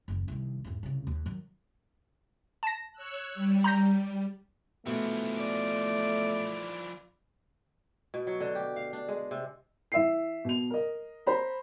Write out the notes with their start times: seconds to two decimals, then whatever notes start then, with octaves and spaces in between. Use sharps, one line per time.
0.08 F#1 D#2
0.28 C2 D#3
0.64 E2 G#2
0.83 C2 C#3
1.07 D#2
1.26 D#3 F#3
2.63 A5 A#6
2.93 C#5 E6 F#6
3.34 G3
3.64 A#5 G6 A#6
4.86 B2 E3 F3 A3
5.37 D5
8.14 B2
8.27 F#3
8.40 D3
8.55 G4
8.76 F5
8.93 D4
9.08 G#3
9.31 C3
9.92 E3 E5 C7
10.45 B2 F7
10.70 A#4 D#5
11.27 C5 A#5 B5